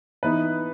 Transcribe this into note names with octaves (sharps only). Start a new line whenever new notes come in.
E3 B3 D#4 B4